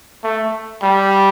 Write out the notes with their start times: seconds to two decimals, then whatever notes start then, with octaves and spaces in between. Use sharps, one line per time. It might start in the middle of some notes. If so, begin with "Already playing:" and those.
0.24 A3
0.83 G3